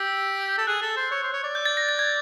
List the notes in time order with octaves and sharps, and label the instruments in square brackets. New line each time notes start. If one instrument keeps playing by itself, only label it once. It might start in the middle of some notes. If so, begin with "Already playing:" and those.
Already playing: [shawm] G4 [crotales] E6
[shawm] A4
[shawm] G#4 [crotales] F#6
[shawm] A4
C5
C#5
C5
C#5
D5
[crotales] G6
A6
A#6
A6
G#6